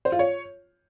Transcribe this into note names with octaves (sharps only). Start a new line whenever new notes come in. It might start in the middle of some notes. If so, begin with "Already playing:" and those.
C5
F4
C#5